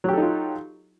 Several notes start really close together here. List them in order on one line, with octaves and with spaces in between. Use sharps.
F#3 G4 A4 D#4 F4